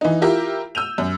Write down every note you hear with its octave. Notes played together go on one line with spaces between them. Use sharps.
E3 D#4
E4 F4 G4 A#4 E5
E6 G6 D#7 F7
F#2